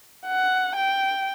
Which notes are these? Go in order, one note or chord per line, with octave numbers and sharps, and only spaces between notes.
F#5
G5